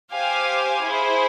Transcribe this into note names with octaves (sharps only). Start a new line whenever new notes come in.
G4 C5 F5 G#5
E4 G#4 C5